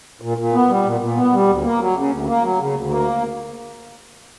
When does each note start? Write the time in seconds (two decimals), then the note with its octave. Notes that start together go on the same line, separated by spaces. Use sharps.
0.22 A#2
0.37 A#2
0.52 B3
0.69 G3
0.84 A#2
1.00 A#2
1.16 B3
1.33 G3
1.47 D2
1.63 A#3
1.79 F#3
1.95 C#3
2.11 D2
2.27 A#3
2.43 F#3
2.59 C#3
2.74 D2
2.90 A#3